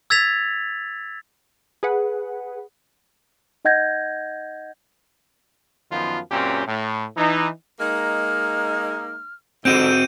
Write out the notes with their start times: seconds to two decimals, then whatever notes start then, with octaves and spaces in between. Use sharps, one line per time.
0.10 E6 G#6 A6 B6 F7
1.83 G#4 B4 F#5
3.65 D#4 D#5 F#5 G6 G#6 A#6
5.91 F#2 D#3 F3 B3 F4
6.31 F#2 A#2 C4 C#4 G4
6.67 A2
7.17 E3 D#4
7.80 G#3 A#3 D#4 F6
9.65 F2 G#2 D3 C4 F#4 G6 D7 D#7